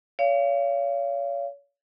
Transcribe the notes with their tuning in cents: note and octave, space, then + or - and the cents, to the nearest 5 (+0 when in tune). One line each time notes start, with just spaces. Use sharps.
C#5 +35 F5 -25